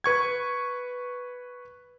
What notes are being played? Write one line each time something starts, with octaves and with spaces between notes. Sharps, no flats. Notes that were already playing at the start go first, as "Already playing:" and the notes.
B4 C#6 G#6